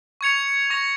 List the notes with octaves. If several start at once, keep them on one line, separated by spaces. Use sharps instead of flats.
C#6 G#6 C#7 F7
C#6 A#6 F7